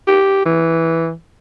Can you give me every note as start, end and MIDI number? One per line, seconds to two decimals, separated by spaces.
0.07 0.41 67
0.45 1.13 52